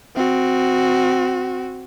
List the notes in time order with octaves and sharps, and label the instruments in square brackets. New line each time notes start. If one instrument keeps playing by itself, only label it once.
[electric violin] C4 F#4